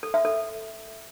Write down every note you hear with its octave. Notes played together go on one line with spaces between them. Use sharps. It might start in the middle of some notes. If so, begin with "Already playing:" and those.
A4
E5
A4